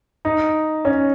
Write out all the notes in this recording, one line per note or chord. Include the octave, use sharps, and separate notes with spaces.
D#4
C#4